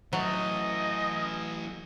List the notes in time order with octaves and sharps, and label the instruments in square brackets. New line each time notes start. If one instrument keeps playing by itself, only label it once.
[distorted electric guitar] E3 A3 [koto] F#3 [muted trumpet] D#5